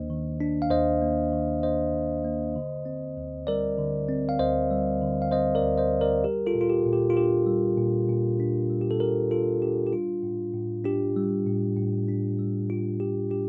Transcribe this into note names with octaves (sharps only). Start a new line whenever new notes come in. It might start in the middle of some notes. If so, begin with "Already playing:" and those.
Already playing: D#2 D#3 A#3 D4 C5 D#5
D#3
D4
F5
D#2 C5 D#5
A#3
D#3
D4 C5 D#5
D#2
A#3
D3
C4
D2
G3 A#4 D5
D3
C4
F5
D2 C5 D#5
G3
D3
F5
C4 C5 D#5
A#4 D5
D2
C5 D#5
G3
A#4 D5
G3 G4 A#4
F4 A4
A#2
F4
G4
A#2
G4
F4
D4 G4
G3
A#2
A#2
D4
G3
G4
A4
A#2 G4 A#4
A#2 F4 A4
D4 G4
G4
G3 F4
A2
A2
D4 G4
G3
A2
A2
D4
G3
A2 F4
A2 G4
D4 G4